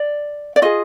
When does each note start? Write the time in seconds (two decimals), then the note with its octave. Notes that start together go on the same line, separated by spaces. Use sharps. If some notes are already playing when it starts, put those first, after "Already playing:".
Already playing: D5
0.56 D5
0.62 F4 G#4 D#5